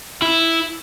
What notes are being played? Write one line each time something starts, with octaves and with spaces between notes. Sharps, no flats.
E4